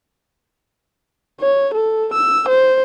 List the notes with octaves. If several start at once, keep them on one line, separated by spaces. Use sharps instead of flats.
C#5
A4
E6
C5